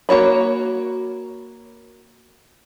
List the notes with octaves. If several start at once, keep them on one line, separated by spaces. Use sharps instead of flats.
A#3 F#4 C#5 B5